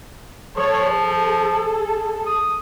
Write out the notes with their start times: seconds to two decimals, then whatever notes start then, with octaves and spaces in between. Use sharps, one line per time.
0.57 F3 A4 C#5
0.90 G#4 A4
2.26 D#6